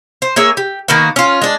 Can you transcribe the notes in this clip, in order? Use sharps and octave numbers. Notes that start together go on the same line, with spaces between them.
C5
A#3 G#4 C#5 E5
G4
D#3 A#3 B3 F#4
C#4 F4
G#3 D4